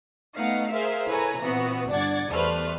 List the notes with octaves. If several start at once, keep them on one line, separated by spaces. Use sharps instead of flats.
A3 B3 D#4 D#5 F5 F#5
G#4 A#4 C5 E5 F5
E4 A4 B4 C#5 G#5 A#5
A#2 E3 B3 C4 F#4
G1 D4 D5 F#5 G#6 A6
E2 G3 A3 B4 C5 F6